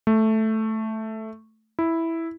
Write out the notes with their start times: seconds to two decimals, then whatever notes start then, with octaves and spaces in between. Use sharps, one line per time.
0.07 A3
1.79 E4